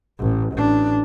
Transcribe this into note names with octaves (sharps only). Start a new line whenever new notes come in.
A1
A1 D4